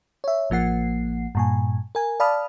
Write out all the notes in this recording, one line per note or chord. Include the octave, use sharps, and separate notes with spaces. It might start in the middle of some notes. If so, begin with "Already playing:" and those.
C#5 E5
A1 F3 A#3 F#5 C7
G2 A#2 G#5
A#4 G#5
D5 F5 A5 B5 D#6 F6